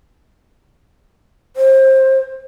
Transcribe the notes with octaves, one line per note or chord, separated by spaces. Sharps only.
C5